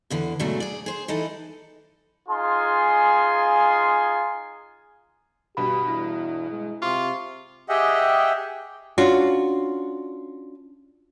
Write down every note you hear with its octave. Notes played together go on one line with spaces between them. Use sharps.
E2 D3 E3
G#2 B2 F#3 A3 D4
G#4 D5
G#4 C5
E3 D#4 E4 A4
D#4 F4 G#4 G#5 C6
G2 B2 G4 B5
E2 E4
G#3
C3 F4 C#6 D6
G4 G#4 D#5 E5 F#5 G5
C#4 D4 F4 F#4